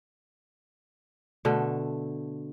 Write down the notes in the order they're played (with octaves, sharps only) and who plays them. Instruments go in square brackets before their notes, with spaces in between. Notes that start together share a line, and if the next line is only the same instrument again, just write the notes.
[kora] B2 D3 A3